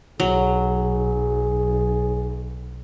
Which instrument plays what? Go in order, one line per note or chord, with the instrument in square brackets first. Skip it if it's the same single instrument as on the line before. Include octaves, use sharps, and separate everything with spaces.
[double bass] B1 [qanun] F#3 [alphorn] G#4